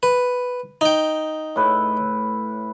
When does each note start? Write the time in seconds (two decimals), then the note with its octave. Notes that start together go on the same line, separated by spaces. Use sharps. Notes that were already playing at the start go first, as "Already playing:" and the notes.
0.03 B4
0.81 D#4 G5
1.56 A2 B4